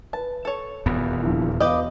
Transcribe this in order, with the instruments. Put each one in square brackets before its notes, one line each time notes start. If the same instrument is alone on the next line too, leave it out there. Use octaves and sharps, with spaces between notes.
[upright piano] B4 [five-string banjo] A5
[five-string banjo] A4 C#5
[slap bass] D#1 E2 B3
[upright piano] C2 D3 F3
[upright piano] E1 F5 [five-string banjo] G4 B4 D#5